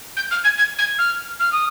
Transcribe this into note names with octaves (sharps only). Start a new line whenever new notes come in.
G6
F6
G#6
G#6
G#6
F6
F6
D#6